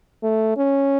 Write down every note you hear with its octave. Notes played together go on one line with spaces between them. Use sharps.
A3
C#4